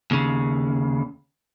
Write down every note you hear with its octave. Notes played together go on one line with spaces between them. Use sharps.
D#2 C#3